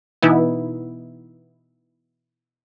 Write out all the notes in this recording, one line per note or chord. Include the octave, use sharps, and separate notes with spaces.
B2 E3 B3 D#4 E4